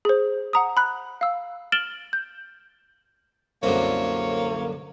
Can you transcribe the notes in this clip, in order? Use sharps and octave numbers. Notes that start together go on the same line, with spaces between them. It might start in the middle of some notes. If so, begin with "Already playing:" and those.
G#4 C5
F#5 A#5 D#6
B5 F#6
F5 E6
F6 A6 D7 E7 F#7 G7
G6
C2 F#2 D3 A#3 E4 C5 C#5